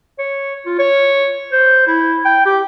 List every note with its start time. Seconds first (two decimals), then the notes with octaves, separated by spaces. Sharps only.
0.18 C#5
0.66 F4
0.79 C#5
1.52 C5
1.87 E4
2.25 G5
2.46 G4